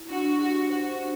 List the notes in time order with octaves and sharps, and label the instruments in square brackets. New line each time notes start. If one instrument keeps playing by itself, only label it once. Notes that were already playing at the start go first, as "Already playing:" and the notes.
Already playing: [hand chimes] E4
[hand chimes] D4 [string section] F#4
[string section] F#4 [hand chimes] G4
[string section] F#4 [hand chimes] C5
[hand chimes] D4